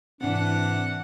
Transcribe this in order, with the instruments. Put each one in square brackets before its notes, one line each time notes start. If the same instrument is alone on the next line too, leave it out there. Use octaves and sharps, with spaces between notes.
[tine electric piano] G#2 C4 [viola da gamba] C3 E3 [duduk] D4 [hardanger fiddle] F#5